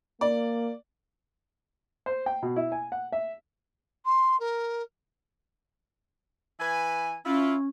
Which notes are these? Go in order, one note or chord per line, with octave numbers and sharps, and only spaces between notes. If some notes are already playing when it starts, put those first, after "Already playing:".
A#3 D5
C5
G5
B2
E4
G#5
F#5
E5
C6
A#4
E3 B4 G#5
C#4 E4 F4